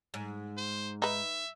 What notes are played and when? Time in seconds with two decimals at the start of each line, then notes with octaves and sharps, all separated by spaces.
0.14 G#2
0.57 C5
1.02 D#4 B4 E5